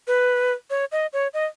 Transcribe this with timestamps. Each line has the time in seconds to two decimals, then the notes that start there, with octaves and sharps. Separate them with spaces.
0.07 B4
0.70 C#5
0.92 D#5
1.13 C#5
1.34 D#5